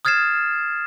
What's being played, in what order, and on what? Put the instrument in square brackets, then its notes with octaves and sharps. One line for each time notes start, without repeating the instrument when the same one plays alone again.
[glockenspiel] D#6 F6 G#6 A6 C7 E7